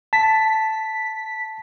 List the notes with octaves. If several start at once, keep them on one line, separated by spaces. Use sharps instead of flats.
A5 B6